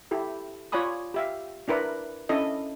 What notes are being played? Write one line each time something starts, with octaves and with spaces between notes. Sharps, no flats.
E4 G4 A4
F4 C#5 D5 G#5 B5 D#6
G4 E5 F5
D4 E4 A#4 B4 D5
C#4 D4 E4 A4 D#5